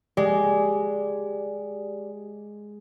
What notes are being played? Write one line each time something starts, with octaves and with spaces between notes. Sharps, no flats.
G#3 G4 D5